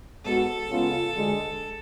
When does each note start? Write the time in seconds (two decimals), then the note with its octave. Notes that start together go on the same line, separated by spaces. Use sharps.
0.24 G#2 G#3 B3 F#4 A4
0.70 C#3 G#3 B3 F4
1.15 D2 D3 G#3